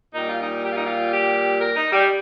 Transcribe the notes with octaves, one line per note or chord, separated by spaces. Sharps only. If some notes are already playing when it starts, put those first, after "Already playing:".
A#2 G3 D#4
F4
D#4
G4
F4
D#4
F4
G4
A#4
D#4
G3